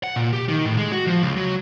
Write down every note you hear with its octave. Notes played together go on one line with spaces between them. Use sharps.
F#5
A#2
G4
D#3
A2
G#3
F#4
F3
C#2
F#3